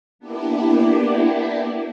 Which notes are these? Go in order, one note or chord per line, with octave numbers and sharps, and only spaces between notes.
A#3 B3 D4 E4 G4